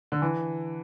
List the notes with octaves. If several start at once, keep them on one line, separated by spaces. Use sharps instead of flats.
D3
E3